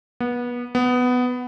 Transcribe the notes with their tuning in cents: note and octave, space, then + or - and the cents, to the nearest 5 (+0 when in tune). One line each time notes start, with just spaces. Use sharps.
B3 -25
B3 +10